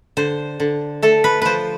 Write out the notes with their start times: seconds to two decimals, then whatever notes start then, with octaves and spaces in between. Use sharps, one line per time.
0.17 D3 C5
0.60 D3
1.02 A3 A4
1.24 B4
1.42 F3 B4 C5